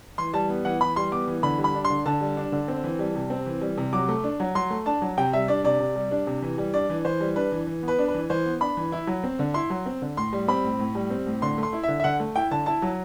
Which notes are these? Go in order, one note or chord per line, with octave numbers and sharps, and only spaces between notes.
E3 C6
G3 A5
B3
E3 F#5
E3 B5
G3 C6
B3 D6
E3
D3 B5
G3
B5
D4
C6
D3
D3 A5
G3
D4
D3
C4
E3
G3
C3
C4
E3
G3
C3
F#3 D6
A3
D4
F#3
F#3 C6
A3
D4 A5
F#3
C3 G5
G3 E5
D4 D5
C3 D5
C3
G3
D4
C3
E3
G3
D4 D5
E3
E3 C5
G3
D4 B4
E3
E3
B3
B4
D4
B4
E3
E3 C5
B3
D4 B5
E3
E4
F#3
C4
D3
E4 C6
F#3
C4
D3
A2 C6
G3
C4 B5
A2
A2
G3
C4
A2
D3 C6
A3
C6
E4
D3 E5
E5
D3 F#5
A3
E4 G5
D3 A5
E4 A5
F#3